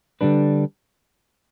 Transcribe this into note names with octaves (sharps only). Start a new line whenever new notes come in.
D3 G3 D4 B4